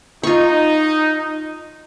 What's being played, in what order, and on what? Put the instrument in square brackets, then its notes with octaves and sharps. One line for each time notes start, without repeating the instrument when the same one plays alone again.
[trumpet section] D#4 [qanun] F4 C#6